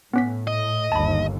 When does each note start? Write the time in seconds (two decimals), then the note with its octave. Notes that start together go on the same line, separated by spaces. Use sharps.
0.13 A2 B3 C#4 B6
0.47 D#5
0.92 G1 D#2 A5 B5